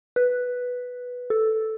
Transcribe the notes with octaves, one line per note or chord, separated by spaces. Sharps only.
B4
A4